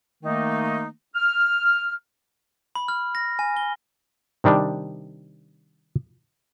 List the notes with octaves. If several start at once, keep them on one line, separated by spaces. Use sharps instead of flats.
D#3 A3 A#3 D#4
F6
B5
F6
A#6
G#5
G7
C3 D#3 G3 D4